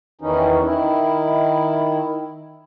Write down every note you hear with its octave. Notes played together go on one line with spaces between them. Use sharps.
E2 D#3 E3 C#4 D#4
D#3 E4